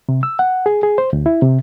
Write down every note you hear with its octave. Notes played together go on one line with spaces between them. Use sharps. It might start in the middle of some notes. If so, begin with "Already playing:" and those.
C3
E6
F#5
G#4
G#4
C5
D2
E4
C3